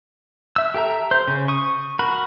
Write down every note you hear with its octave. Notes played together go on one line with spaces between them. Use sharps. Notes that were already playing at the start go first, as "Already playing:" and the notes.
E5 E6
G4 A4 E5 A#5
C5
C#3
C#6 D#6
F#4 A#4 B5